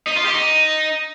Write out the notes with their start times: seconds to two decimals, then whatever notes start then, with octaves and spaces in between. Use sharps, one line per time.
0.07 D#4
0.16 F4
0.25 G4
0.35 D#4